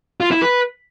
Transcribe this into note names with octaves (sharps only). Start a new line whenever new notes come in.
F4
E4
B4